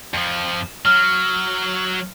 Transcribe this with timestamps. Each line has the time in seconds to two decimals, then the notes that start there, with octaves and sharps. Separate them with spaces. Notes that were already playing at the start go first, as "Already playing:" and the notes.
0.14 F2 F3
0.85 F#3 F6